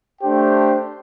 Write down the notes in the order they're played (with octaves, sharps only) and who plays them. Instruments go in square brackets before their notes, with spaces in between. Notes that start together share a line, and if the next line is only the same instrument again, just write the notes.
[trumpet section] A3 D4 G4 C5 G5